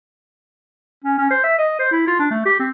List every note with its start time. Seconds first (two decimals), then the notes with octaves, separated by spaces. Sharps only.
1.04 C#4
1.18 C#4
1.31 C5
1.44 E5
1.58 D#5
1.79 C5
1.91 E4
2.07 F4
2.19 D4
2.31 A3
2.45 G4
2.60 C4